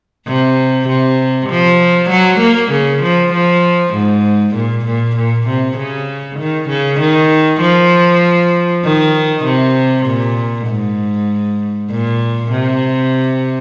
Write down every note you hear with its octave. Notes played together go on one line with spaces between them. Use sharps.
C3
C3
F3
F#3
A#3
C#3
F3
F3
G#2
A#2
A#2
A#2
C3
C#3
D#3
C#3
D#3
F3
D#3
C3
A#2
G#2
A#2
C3